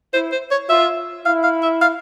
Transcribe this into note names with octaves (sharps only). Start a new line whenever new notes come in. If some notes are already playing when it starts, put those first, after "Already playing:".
E4 C5
C5
C#5
F4 E5
E4 F5
F5
E5
F5